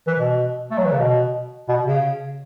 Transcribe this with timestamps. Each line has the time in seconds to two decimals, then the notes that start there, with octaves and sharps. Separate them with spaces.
0.07 E3
0.19 B2
0.71 A3
0.78 F#3
0.85 E3
0.92 C#3
0.99 B2
1.69 B2
1.86 C#3